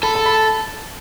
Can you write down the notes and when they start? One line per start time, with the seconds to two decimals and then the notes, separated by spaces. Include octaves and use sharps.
0.03 A4 B5
0.15 A5
0.26 B5